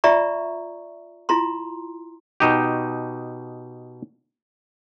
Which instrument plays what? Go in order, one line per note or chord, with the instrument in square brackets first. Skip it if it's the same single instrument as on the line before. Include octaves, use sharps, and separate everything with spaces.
[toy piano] F4 D5 E5 A#5 C#6
E4 F4 A#5 C6
[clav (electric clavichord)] B2 D#4 G4